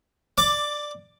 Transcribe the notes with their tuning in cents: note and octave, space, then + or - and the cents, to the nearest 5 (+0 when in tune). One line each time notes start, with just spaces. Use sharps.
D5 +10 D6 +0